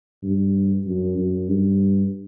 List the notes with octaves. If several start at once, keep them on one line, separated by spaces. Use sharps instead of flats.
G2
F#2
F#2
G2